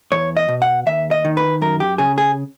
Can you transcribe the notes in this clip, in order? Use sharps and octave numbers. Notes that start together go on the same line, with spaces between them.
E2 C#5
D#5
B2
F#5
D#2 E5
D#5
D#3
B4
F#2 A#4
G4
C#3 G#4
G#4